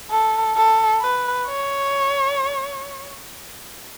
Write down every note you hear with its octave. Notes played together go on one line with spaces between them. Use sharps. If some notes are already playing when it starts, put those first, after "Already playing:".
A4
A4
B4
C#5